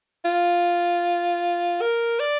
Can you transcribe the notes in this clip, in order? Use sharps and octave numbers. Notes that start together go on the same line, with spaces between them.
F4
A#4
D5